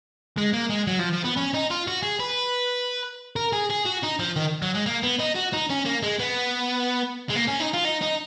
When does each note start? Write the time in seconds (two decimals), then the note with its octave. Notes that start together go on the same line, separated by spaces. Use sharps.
0.37 G#3
0.53 A#3
0.70 G#3
0.87 F#3
0.99 F3
1.13 F3
1.24 B3
1.36 C#4
1.54 D#4
1.70 F4
1.87 F#4
2.03 G#4
2.20 B4
3.36 A#4
3.53 G#4
3.70 G#4
3.86 F#4
4.04 D#4
4.20 F3
4.36 D#3
4.62 F#3
4.74 G#3
4.86 A#3
5.03 B3
5.20 D#4
5.36 F#4
5.53 D#4
5.70 C#4
5.86 A#3
6.03 G#3
6.20 B3
7.30 G#3
7.36 A#3
7.48 C#4
7.61 D#4
7.74 F4
7.85 D#4
8.02 D#4